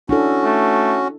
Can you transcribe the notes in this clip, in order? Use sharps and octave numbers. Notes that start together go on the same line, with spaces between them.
C#4 D4 E4 F#4 A4
A3